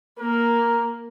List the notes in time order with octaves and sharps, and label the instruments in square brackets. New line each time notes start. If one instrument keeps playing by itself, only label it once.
[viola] A#3 [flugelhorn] A#4